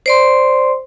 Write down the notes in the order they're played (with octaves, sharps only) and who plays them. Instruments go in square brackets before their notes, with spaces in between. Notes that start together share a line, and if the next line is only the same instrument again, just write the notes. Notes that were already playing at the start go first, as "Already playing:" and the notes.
[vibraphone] C5 D5 C6